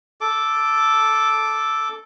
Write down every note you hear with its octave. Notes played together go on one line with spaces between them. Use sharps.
A4 D6